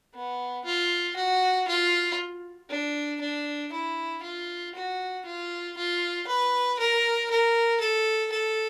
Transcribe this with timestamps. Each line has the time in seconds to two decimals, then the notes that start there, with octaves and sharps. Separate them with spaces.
0.15 B3
0.65 F4
1.16 F#4
1.68 F4
2.70 D4
3.21 D4
3.72 E4
4.23 F4
4.74 F#4
5.25 F4
5.77 F4
6.27 B4
6.79 A#4
7.31 A#4
7.80 A4
8.32 A4